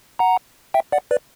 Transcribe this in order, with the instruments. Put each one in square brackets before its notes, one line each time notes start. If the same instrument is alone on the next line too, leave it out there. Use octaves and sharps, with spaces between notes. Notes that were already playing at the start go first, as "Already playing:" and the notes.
[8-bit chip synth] F#5 A#5
E5 G5
D5 F#5
B4 D5